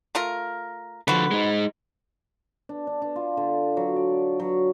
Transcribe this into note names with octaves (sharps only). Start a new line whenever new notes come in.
A3 F4 A#4
D3 F3 F#4 B4
G#3 D#4
D4
D4
D4
F4
D3
F#3
D5
F#3